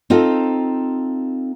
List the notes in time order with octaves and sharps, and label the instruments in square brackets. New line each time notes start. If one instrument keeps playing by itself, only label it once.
[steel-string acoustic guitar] C4 D#4 F4 A4